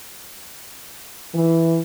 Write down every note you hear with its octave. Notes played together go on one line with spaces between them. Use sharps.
E3